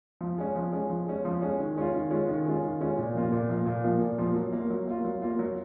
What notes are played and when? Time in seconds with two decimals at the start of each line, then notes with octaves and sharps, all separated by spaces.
0.21 F3
0.38 G#3 C#4
0.56 F3
0.72 G#3 C#4
0.90 F3
1.07 G#3 C#4
1.25 F3
1.42 G#3 C#4
1.59 D#3
1.76 G#3 C#4 F4
1.94 D#3
2.10 G#3 C#4 F4
2.28 D#3
2.45 G#3 C#4 F4
2.62 D#3
2.81 G#3 C#4 F4
2.98 A#2
3.14 F3 A#3 F4
3.32 A#2
3.49 F3 A#3 F4
3.66 A#2
3.84 F3 A#3 F4
4.01 A#2
4.18 F3 A#3 F4
4.36 F#3
4.53 A#3 F4
4.70 F#3
4.87 A#3 F4
5.04 F#3
5.22 A#3 F4
5.39 F#3